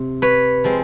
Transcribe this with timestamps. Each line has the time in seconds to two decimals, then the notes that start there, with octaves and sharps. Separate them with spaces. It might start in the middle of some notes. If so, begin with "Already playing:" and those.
Already playing: C3
0.22 B4 C#5
0.64 F3 G#3 C4